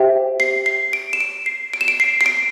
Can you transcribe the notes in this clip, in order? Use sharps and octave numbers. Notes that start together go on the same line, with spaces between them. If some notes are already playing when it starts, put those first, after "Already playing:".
Already playing: G4 C5 E5 G5
C7
C7
D7
E7
D7
C7
D7
E7
D7
C7
C7
D7